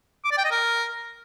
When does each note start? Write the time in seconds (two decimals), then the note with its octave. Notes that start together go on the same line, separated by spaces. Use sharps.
0.25 D6
0.31 D5
0.38 G5
0.44 D#5
0.51 A#4